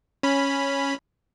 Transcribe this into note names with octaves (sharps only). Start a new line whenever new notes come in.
C#4 B5